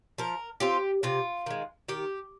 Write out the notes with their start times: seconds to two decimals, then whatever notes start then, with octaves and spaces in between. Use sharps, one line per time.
0.18 F3 A#4
0.60 C4 F4 G4
1.03 C3 F4
1.46 D#3 G#3
1.88 D#3 G4